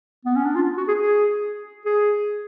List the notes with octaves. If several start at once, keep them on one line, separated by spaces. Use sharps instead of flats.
B3
C#4
D4
F4
F#4
G#4
G#4
G#4